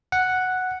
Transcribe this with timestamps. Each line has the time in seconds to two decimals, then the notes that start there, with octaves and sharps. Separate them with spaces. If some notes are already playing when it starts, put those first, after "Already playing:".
0.12 F#5